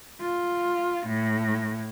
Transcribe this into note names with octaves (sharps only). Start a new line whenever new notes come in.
F4
A2